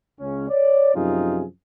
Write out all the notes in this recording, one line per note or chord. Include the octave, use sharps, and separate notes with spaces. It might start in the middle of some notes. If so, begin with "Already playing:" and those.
C#2 C#4
C#5 D5
F#2 C3 F3 D#4 F4 G#4